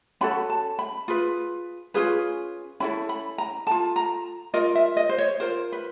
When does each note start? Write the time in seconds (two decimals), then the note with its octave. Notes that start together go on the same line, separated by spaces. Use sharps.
0.21 C#4 F#4 A4 B5
0.50 A5
0.79 B5
1.08 F4 G#4 B4
1.94 C#4 F4 G#4 B4
2.80 C#4 E4 A4 B5
3.09 B5
3.38 A#5
3.67 F4 A4 A5
3.96 A#5
4.54 F4 A#4 D#5
4.75 E5
4.97 D#5
5.09 C5
5.18 C#5
5.40 F4 A#4 C5
5.72 B4